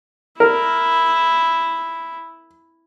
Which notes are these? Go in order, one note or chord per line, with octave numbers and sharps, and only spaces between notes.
E4 A#4